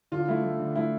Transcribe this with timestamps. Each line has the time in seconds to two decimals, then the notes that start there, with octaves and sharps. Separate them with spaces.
0.12 D3 F4
0.28 A3 E4
0.43 A3
0.60 D3
0.75 A3 E4